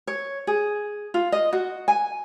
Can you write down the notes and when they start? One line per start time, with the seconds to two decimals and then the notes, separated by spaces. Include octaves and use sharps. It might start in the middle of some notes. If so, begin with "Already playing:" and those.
0.07 C#5
0.47 G#4
1.14 F4
1.32 D#5
1.53 F#4
1.88 G#5